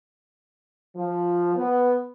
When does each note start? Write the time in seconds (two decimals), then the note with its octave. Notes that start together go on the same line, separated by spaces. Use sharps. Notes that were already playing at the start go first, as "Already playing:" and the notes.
0.96 F3
1.56 B3